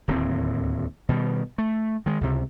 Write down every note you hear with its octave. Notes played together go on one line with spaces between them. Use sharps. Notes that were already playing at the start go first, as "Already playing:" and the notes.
D1 D#2 A2 C4
B2 D#3 G3
A3
D#3 G#3
C#2 C3